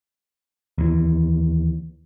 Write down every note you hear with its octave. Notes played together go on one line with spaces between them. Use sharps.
D#2 E3